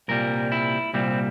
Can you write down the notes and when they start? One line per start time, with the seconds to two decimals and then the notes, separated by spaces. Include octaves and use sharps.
0.08 C2 A#2 G3 A#4
0.52 E4
0.94 C2 A#2 G3 C4